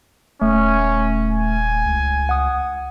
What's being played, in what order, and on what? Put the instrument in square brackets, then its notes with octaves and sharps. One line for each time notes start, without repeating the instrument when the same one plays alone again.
[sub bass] D#1 [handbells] A3 [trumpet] C#4
[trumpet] G#5
[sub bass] C#2
[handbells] F#5 D#6